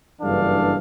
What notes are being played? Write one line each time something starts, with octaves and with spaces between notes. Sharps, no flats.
F#1 G2 E3 D4 A4 F5